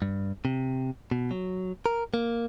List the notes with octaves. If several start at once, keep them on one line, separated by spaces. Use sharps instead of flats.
G2
C3
B2
F#3
A#4
A#3